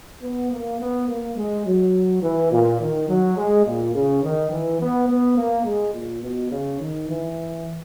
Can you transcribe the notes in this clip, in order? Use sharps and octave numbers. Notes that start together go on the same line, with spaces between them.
B3
A#3
B3
A#3
G#3
F#3
E3
A#2
D#3
F#3
G#3
A#2
C#3
D#3
E3
B3
B3
A#3
G#3
A#2
B2
C#3
D#3
E3